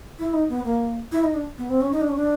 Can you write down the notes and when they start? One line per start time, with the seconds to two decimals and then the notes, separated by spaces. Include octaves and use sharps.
0.19 E4
0.33 D#4
0.49 B3
0.65 A#3
1.12 E4
1.24 D#4
1.34 D4
1.58 B3
1.70 C4
1.81 C#4
1.92 D#4
2.01 D4
2.09 C#4
2.16 D4